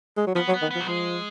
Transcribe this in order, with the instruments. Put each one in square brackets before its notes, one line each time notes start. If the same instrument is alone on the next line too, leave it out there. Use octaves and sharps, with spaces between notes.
[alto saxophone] G#3
F#3
[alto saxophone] F3 [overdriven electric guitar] B3
[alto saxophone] F#3
[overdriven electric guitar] B3
[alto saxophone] D#3
[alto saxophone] F3 [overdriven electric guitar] B3
[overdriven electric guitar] F#3
[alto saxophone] F3 [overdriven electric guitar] G#3